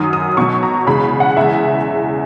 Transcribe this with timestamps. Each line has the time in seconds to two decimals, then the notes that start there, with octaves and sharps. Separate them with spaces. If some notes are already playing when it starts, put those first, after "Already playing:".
Already playing: F#2 D#3 F#3 D#6
0.13 D#6
0.37 B2 F#3 C#6
0.63 A#5
0.86 E2 C#3 G#3 B5
1.20 F#5
1.36 E2 C#3 E3 G#3 E5